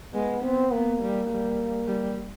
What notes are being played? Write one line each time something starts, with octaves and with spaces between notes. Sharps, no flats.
G#3 B3
B3 C4
A#3 B3
G3
G3
G3